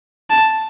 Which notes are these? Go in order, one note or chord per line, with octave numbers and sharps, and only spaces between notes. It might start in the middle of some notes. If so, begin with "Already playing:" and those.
A5